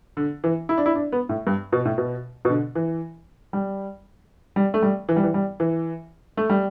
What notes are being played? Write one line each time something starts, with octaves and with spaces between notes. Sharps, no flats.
D3
E3
E4
D4
E4
D4
B3
A2
G2
B2
A2
B2
B2
D3
E3
G3
G3
A3
G3
E3
G3
E3
G3
E3
A3
G3